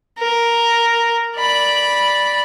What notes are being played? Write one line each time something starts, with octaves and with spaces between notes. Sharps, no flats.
A#4
D5 B5